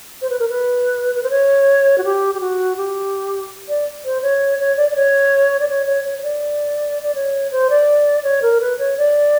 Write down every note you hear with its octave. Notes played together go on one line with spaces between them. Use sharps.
C5
B4
A#4
B4
B4
C5
C#5
F#4
G4
G4
F#4
G4
D5
C5
C#5
C#5
D5
D5
C#5
D5
C#5
C#5
C#5
C#5
D5
D5
C#5
C5
D5
C#5
A#4
B4
C#5
D5